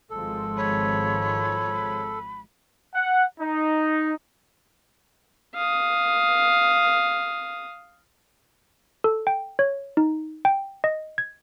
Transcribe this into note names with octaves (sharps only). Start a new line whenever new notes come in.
G#1 F3 G#3 A4
C#5 B5
F#5
D#4
F5 D#6
A4
G5
C#5
D#4
G5
D#5
G#6